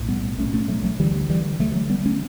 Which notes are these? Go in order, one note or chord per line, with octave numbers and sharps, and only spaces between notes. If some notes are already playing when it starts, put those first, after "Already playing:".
Already playing: B1 A2
G3 B3
B1 A3 C#4
A2
A3 C#4
F#3 A3
F#3 A3
D2 D3 E3 G3
E3 G3
D2 D3 F#3 A3
F#3 A3
G3 B3
A3 C#4